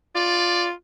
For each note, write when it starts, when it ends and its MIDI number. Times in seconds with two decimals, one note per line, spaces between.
0.15 0.72 65
0.15 0.67 74